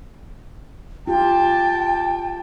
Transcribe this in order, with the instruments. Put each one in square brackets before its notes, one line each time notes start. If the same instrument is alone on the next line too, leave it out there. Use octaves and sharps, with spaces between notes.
[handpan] F4 G4 [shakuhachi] G5 [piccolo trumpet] A5